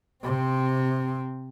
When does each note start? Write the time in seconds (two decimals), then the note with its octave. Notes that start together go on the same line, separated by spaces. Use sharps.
0.24 C3 C4